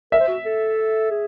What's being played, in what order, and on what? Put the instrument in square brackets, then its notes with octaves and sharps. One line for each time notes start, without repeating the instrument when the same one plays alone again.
[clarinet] A#4 [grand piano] E5
[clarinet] C5
F#4
A4
G#4